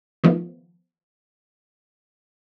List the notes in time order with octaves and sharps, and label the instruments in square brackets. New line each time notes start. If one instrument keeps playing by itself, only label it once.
[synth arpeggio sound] D#3 F3 A3 B3